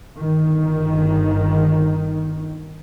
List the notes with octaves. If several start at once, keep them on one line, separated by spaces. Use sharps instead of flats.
G1 D#3